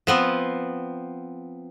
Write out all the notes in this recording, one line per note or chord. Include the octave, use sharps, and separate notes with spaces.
F3 B3 C4